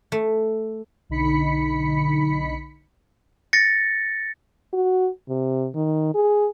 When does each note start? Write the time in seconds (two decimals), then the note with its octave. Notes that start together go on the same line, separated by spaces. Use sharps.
0.12 A3
1.09 B1 D3 D#4 B5 B6 C#7
3.53 A6 A#6 C#7
4.73 F#4
5.29 C3
5.75 D#3
6.14 G#4